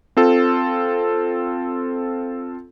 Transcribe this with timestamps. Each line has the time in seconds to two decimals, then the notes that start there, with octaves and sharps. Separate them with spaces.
0.17 C4 F4 A4